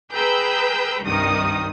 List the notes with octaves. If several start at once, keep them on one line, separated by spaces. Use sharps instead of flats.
G#4 B4 G5 A#5 E6 G6
C2 G2 D#3 D#6